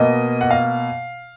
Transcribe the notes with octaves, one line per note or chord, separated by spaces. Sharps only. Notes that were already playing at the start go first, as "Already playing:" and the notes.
Already playing: B2 A#3 D#5
F#5
F5